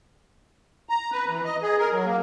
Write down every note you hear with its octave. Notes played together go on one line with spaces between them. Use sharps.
A#5
B4
E3
D#5
G#4
A#4
F#3
A#3